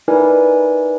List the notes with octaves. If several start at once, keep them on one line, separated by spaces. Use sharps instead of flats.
D#4 E4 A#4 B4 D5 G#5